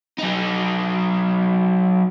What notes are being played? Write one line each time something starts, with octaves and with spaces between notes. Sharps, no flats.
F#3 D#4